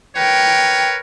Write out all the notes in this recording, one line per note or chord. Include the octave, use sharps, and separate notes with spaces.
A#4 B4 C#5 G5